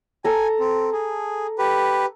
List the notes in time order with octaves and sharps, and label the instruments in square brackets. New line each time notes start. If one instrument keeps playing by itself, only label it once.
[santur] A4 A#5 [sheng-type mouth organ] G#5
[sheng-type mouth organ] C4
G#4
G4 B4